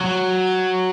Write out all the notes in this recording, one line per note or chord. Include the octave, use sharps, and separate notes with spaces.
F#3